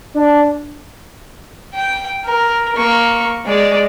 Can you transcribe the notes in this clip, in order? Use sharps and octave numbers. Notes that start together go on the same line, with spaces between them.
D4
G5
A#4
A#3 C#6
G#3 D5